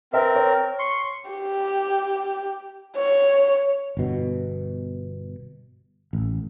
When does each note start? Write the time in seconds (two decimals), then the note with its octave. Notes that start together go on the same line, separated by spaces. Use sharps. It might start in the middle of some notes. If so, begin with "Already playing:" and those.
0.13 C4 A#4 B4 E5
0.36 C#5
0.79 C6 C#6
1.31 G4
2.97 C#5
3.97 G1 B2
6.13 A1